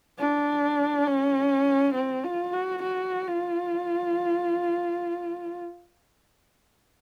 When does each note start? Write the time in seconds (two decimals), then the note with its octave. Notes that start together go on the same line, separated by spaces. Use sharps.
0.19 D4
1.07 C#4
1.95 C4
2.24 F4
2.53 F#4
2.83 F#4
3.27 F4